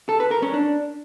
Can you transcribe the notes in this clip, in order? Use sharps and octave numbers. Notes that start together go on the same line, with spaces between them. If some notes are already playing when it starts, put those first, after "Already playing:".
A4
B4
A#4
C#4
D4